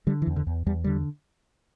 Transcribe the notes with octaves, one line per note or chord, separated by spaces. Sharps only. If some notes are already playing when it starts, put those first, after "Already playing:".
D3 G3
E3
E2
D3
E2
E2 G3
D3 G3